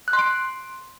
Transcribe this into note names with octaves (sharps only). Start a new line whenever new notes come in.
F#6
C6
D7